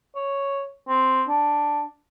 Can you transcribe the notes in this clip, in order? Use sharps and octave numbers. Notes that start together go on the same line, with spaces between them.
C#5
C4
D4